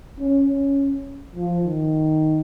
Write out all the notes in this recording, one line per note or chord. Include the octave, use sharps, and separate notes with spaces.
C#4
C#4
F3
D#3